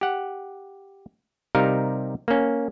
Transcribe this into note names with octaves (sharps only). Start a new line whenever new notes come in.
G4 F#5
C3 G3 D#4 A#4 F5
A#3 C#4